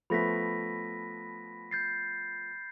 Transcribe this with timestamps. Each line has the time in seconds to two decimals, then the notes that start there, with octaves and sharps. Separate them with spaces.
0.10 F3 A3 B3 B5 A#6 B6
1.71 G6 A6 C7